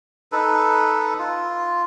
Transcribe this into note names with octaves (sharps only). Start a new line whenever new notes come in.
D#4 A4 B4
F4